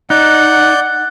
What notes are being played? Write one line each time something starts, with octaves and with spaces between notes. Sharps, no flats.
D#4 D5 F#5 F#6 G6